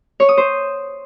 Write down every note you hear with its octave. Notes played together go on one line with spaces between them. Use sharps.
C#5
D#6
C5